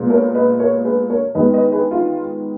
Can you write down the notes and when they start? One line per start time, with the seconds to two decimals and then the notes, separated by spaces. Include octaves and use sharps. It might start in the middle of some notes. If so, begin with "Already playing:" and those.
Already playing: A#2 G#3 B3
0.10 A#4 C#5
0.35 B4 D#5
0.60 A#4 C#5
0.84 G#4 B4
1.10 A#4 C#5
1.35 D#3 G#3 B3 B4 D#5
1.54 B4 D#5
1.72 G#4 B4
1.91 F4 G#4